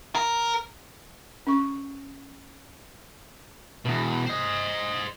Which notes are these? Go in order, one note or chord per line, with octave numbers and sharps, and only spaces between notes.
A#4
C#4 C#6
E2 B2
C5 D#5